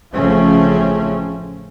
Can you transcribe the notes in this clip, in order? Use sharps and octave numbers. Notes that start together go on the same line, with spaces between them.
A1 C#3 F3 A3 C4 C#4